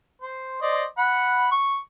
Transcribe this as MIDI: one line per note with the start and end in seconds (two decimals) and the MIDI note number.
0.22 0.61 72
0.62 0.84 72
0.62 0.84 74
0.62 0.84 75
0.98 1.51 78
0.98 1.51 83
1.51 1.78 85